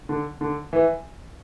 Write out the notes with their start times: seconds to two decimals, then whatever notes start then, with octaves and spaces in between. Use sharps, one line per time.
0.09 D3
0.41 D3
0.73 E3